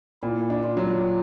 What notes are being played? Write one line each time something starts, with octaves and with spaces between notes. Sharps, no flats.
A#2 E4
D4
F4
F#3